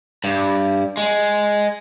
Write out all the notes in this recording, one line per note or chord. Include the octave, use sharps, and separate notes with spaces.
G2
G#3